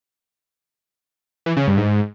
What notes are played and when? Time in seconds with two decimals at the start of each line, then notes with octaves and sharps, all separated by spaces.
1.46 E3
1.57 C#3
1.67 G2
1.78 G#2